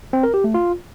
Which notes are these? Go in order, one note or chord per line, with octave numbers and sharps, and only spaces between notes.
C4
A#4
G4
A3
F4